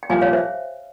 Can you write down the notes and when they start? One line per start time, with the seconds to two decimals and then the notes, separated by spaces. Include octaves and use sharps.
0.03 G5
0.09 C2 A#2 F3 F5 G#5
0.21 C#5 F5
0.33 C5 E5